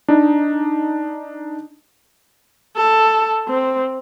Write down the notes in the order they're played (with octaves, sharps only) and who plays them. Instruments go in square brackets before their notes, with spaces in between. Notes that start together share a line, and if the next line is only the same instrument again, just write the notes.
[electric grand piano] D4 D#4
[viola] A4
C4